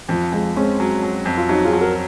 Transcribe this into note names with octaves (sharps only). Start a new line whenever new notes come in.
F2 F3
F2 F3 G#3
G#3 C4 C#4
F#3
F#3
F2
F4
F#3 D#4 F#4
F4 G#4
F#3
F#4 A#4